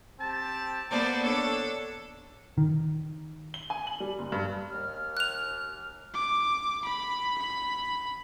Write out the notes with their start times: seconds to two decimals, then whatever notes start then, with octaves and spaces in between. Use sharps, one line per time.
0.20 C4 G4 A5
0.90 A#3 B3 C5 D5 A5
1.23 D4 A4 C#5
2.58 D#3
3.54 G7
3.70 G#5
3.87 F#7
4.00 G3
4.19 F#1
4.32 G2
4.71 D#2 F6
5.17 F#6 F7
6.14 D6
6.85 B5
7.38 B5